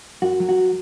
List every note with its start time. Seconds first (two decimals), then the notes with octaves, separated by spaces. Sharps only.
0.22 F#2 F#4
0.40 F#3
0.49 F#4